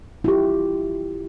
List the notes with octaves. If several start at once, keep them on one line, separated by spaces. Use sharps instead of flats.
E4 F4 G4